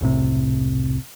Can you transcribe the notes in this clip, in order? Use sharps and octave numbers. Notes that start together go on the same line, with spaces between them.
E1 C2 A2 C3